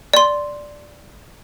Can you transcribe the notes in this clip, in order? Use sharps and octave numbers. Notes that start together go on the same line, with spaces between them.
D5 C6